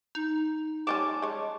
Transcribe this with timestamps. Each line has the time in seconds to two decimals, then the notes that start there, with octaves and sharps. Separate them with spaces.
0.15 D#4
0.87 F3 G3 C#4 A5 D6
1.22 G#3 C#5